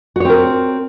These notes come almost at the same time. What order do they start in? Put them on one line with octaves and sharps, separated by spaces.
F#4 C#5 C4 A#4